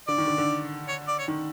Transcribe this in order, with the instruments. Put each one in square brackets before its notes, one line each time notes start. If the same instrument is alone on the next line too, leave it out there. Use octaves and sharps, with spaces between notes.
[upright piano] D3 [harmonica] D5
[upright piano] D#3
D3
D3
[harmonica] C#5
D5
C#5
[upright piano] D#3